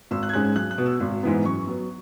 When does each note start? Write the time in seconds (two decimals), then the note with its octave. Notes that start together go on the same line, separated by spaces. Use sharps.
0.11 G#1 E6
0.23 F#6
0.29 G#6
0.33 G#2 G#3 C#4 F#6
0.45 G#6
0.56 B1 F#6
0.71 F#6
0.78 B2 B3
0.86 E6
1.00 G#1
1.23 G#2 E3 B3
1.45 F#2 C#6
1.67 F#3 B3